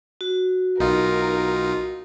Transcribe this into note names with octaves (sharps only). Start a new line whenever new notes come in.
F#4
B1 D#4 F4 A#4